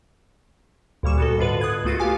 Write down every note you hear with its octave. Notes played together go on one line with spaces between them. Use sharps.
D2 A#2 G3 C#6 E7
B3 F#4 A4
G#2 D3 F4 B4
D#6 F#6 G#6
C#2 A3 B3 F4 F#4 A6
G4 F5 G#5 D6